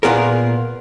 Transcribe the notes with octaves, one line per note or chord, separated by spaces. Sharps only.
A#2 B3 G#4 A#4